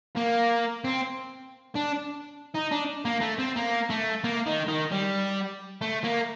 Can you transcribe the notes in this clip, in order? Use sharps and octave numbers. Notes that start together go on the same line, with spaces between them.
A#3
C4
D4
D#4
D4
A#3
A3
C4
A#3
A3
A#3
D#3
D#3
G3
A3
A#3